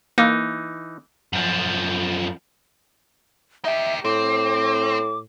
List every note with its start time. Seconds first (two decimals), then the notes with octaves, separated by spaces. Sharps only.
0.18 E3 A#3 D#4
1.33 F#2 F3
3.65 D#4 G4 E5
4.05 A2 C4 D6